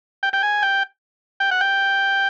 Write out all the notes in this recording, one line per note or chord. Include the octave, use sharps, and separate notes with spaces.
G5
G5
G#5
G5
G5
F#5
G5